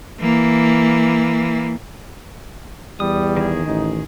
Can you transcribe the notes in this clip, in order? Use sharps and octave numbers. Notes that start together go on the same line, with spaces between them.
E3 A#3
E2 G3 D#6
D#3 G#4
A1 D#4